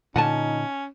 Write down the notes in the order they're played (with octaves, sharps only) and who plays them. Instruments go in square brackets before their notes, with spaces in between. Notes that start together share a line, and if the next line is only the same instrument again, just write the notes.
[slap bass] A#2 D3 [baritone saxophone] C#4 [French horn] D#4 [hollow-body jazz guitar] F#5 G#5 A5